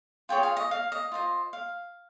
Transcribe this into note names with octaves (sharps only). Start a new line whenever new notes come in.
F4 G#4 C#5 G5
F5
D#5
F5
D#5
F4 C5 D#5
F5